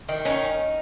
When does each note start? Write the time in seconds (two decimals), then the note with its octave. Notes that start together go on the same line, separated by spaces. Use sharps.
0.09 D#3
0.25 C#4 D#4